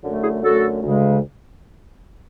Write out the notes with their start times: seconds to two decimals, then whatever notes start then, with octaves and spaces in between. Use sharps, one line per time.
0.02 F#2 D3 A3
0.22 E4 G#4
0.42 F#2 D3 A3 F#4 A4
0.82 D2 C#3 G#3